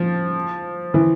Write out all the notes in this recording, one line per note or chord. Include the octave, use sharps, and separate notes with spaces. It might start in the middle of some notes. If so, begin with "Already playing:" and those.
Already playing: F3
E3